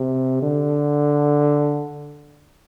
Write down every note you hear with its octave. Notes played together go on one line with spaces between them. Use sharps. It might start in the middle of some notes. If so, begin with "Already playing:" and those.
Already playing: C3
D3